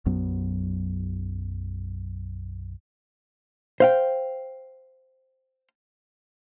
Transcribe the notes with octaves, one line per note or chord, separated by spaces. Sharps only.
B1 F#2 F#3 B3
C5 F5 G5